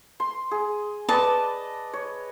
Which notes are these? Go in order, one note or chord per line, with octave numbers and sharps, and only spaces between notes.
C6
G#4
B4 D5 D#5 A5
C#5